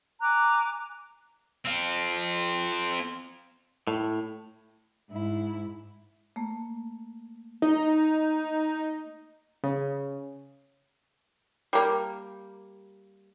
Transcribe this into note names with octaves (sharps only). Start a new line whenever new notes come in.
G#5 A#5 D6 F#6
C4 F4
A2
G#2 E4
A3 A#3
D#4
C#3
G3 A#3